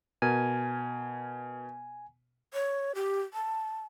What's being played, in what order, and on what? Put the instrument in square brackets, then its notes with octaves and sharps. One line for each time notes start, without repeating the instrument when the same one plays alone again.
[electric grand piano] B2 A#4 [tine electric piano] G#5
[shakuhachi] C#5
G4
A5